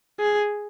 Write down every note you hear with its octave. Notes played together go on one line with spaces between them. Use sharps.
G#4